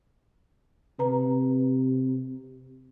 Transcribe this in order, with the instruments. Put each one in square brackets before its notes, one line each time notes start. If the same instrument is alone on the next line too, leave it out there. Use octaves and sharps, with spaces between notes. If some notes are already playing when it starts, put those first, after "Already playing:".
[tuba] C3 [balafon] B4 A#5